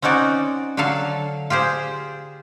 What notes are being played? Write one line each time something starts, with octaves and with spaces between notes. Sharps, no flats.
C4 C#4 D#4 F#4 D5
D3 F#3 A4 F5 A5
F4 G4 G#4 C5